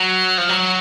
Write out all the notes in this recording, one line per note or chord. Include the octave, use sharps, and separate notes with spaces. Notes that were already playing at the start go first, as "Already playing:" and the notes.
Already playing: F#3
F3
F#3